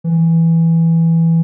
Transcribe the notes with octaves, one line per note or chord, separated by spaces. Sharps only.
E3